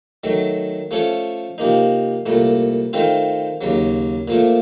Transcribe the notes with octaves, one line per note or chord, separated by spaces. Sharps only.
D#3 F#3 A3
F3 A3 C#4 A4 C#5
C3 F3 A#3 D#4
C2 A#2 A3
D#3 A3 C4 F4
D#2 C#3 F#3
A#2 F3 A3